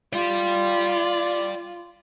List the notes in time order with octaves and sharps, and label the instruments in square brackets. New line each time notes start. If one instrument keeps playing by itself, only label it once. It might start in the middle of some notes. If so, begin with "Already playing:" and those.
[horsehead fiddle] F4 [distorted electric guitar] D5 G5